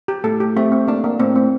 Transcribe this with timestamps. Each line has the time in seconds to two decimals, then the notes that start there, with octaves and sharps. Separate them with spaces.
0.08 G4
0.24 A2 A4
0.40 G4
0.56 A3 C4
0.72 C4
0.88 A#3 D4
1.04 A#3
1.19 A2 C4
1.35 C4